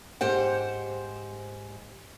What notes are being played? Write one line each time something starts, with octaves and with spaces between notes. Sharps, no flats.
G#2 G4 C5 F#5